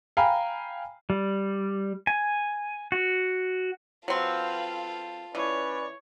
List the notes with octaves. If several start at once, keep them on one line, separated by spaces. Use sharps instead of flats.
F5 G5 G#5 A#5 B5
G3
G#5
F#4
F#3 C4 F4 A4 B4 F5
E3 C#4 B4 C#5 D5